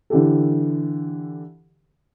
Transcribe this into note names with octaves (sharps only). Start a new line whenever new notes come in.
D3 E3 G4 A4